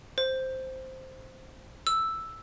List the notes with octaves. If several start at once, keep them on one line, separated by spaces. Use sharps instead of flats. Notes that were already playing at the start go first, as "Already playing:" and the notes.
C5
E6